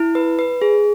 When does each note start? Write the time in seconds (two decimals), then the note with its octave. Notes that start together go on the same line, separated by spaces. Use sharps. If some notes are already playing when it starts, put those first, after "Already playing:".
Already playing: E4
0.15 B4
0.39 B4
0.62 G#4